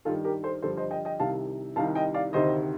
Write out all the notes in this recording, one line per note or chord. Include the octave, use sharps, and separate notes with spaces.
G2 D#3 F4 A4
G4 A#4
A4 C5
G2 D3 F3 A4 C5
C5 D#5
D#5 G5
D#5 G5
C2 C3 D#3 F5 A5
C2 C3 D#3 F5 A5
D#5 G5
D5 F5
D2 C3 D#3 C5 D#5